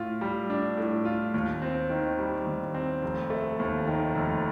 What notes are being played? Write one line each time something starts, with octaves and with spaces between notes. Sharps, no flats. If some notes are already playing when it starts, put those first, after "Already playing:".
Already playing: A2 F4
G3
D4
A2
F4
D#2
C4
D#3
G3
D#2
C4
F1
A3
D#2
D#3
F1